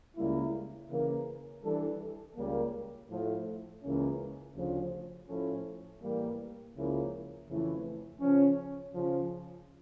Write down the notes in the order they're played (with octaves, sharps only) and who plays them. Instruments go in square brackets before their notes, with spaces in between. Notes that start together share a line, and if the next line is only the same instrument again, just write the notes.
[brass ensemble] C#2 C#3 G3 A#3 E4
C#3 E3 A#3
E3 G3 D4 A4
C#2 C#3 G3 A#3
A2 F3 A3
C#2 C#3 E3 A#3 C#4
D2 C#3 F3
A2 F3 C#4 E4 A4
A2 E3 G3 A#3
C#2 C#3 F3 A#3 E4
F2 C#3 E3 A3
C#3 F3 C#4
C#3 F3 C#4 F4